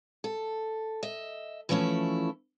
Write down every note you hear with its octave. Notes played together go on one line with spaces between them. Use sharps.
A4
D#5 E5
E3 F3 A3 C#4 E4